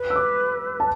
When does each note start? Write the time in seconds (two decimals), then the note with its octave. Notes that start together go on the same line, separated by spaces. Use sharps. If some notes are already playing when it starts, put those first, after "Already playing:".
Already playing: B4
0.10 E6
0.16 D6
0.80 A5